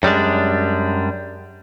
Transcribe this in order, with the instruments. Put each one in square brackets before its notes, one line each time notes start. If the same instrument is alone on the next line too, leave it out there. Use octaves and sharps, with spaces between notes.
[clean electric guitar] F#2 G3 G#3 D4